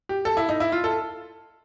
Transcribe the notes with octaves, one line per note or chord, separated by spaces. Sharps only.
G4
A4
E4
D#4
E4
F4
A4